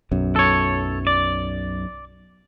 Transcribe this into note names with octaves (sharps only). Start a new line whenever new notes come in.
B1 F#2
A4 C#5
D5